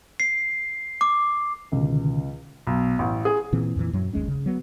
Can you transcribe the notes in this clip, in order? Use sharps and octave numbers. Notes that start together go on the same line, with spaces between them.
C7
D6
C#2 B2 D3 D#3
B1
A1
G#4
A#2 E3 C4
F2 A#2 D#3 E3
F#2 F#3
G#1 D#2 G#3 C#4
C#3
F#3 B3